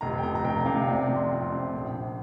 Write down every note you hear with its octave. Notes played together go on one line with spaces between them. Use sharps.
F1 A#5
G5
F2 A#5
A#5
F1 G5
G5
C3 F5
C3 D5
D5
F2
C6
F2
C3
A#1
A#1